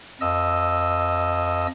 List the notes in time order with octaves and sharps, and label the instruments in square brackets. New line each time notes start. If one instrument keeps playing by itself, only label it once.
[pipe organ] F2 D#5 E6